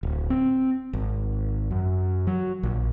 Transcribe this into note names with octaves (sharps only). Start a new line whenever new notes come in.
D1
C4
G#1
F#2
F#3
A#1